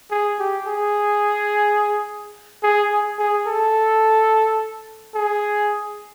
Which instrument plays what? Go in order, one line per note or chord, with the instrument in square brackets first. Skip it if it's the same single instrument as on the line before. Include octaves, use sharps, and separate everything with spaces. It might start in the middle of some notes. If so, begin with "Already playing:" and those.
[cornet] G#4
G4
G#4
G#4
G#4
G#4
A4
G#4